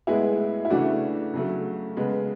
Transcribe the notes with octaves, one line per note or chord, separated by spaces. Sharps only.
A2 G#3 B3 E4 G#4
E4
C#3 E3 A3 D4 F#4
C#3 F#3 A3
C#3 G#3 B3